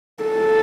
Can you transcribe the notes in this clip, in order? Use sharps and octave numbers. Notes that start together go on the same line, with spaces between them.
A4